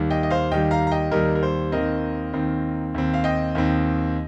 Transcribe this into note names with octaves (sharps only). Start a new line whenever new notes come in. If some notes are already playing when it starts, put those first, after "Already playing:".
Already playing: D#2 D#3 G3
D#5 G5
D#5
C5 F5
D#2 D#3 G3 D#5 G5
F5 A#5
A#5
D#5 G5
D#2 D#3 G3 A#4 D#5
A#4
C5
D#2 D#3 C4 A#4 D#5
D#2 D#3 C4
D#2 D#3 C4
F5
D#5 G5
D#2 D#3 C4